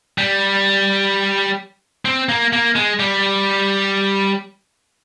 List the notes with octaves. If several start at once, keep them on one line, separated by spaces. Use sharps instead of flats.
G3
C4
A#3
A#3
G#3
G3